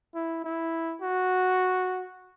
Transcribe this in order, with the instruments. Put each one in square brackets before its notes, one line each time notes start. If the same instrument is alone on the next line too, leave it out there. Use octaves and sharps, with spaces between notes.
[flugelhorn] E4
E4
F#4